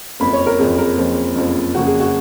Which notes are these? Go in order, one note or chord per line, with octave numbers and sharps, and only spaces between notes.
F#1 F2 F3 A#3 B5
C#5
A#4
F#1 F2 F3 A#3 G#4
A#4
F#1 F2 F3 A#3
F#1 F2 F3 A#3
F#1 F2 C#3 F#3 A#3 F#4
G#4
F#4